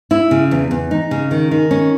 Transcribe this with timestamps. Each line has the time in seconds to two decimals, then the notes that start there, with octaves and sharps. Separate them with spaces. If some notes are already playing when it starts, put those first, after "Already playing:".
0.11 E4
0.31 C#3
0.51 E2
0.71 E2
0.91 D#4
1.11 C#3
1.31 D#3
1.51 D#3
1.71 C#4